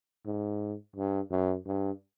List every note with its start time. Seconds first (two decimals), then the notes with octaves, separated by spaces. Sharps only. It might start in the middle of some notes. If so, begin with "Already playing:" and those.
0.26 G#2
0.96 G2
1.31 F#2
1.66 G2